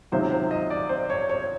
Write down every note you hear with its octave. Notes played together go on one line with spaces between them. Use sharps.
C#2 C3 D#3 F#3 A3 C5
C5
D#5
D5
C5
C#5
C#5